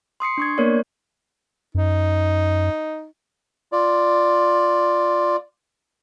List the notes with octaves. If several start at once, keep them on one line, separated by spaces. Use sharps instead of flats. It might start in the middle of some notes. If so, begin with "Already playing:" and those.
C6 D#6 C7 C#7
D4 C#6 G#6
A#3 B3 A#4 C#5 D5
F#2 D#4
F4 D5